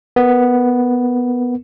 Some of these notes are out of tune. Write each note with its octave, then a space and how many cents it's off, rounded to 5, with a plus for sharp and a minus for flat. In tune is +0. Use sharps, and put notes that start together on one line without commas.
B3 +0 A#4 +0